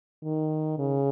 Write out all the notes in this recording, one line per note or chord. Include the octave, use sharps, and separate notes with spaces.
D#3
C#3